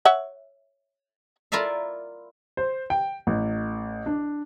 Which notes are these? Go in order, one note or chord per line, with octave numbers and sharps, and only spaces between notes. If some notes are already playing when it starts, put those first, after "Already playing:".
C#5 E5 F#5
E4 F4 A#4 D5 E5 F5
C5
G5
A1
D4